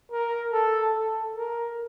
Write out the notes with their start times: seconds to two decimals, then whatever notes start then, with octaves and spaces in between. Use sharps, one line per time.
0.12 A#4
0.53 A4
0.94 A4
1.36 A#4